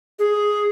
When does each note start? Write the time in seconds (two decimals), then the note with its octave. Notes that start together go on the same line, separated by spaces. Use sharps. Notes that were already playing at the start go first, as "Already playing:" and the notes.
0.19 G#4